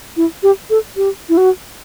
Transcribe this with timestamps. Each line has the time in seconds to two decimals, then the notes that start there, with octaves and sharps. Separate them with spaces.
0.17 E4
0.43 G4
0.70 A4
0.97 G4
1.29 E4
1.37 F#4